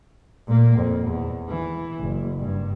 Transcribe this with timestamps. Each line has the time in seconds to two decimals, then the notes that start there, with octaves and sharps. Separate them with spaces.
0.47 A#2 A#3
0.78 F2
1.08 E2
1.49 E3
2.00 F#1
2.40 G2